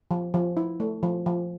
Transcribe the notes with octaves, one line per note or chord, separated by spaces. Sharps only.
F3
F3
E4
A3
F3
F3